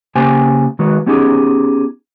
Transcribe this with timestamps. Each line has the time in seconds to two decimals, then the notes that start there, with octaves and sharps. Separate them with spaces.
0.15 C#3 A#3 G4 C5 G5 G#5
0.79 D#3 G#3 F#4 B4
1.06 B3 C#4 D#4 G4 G#4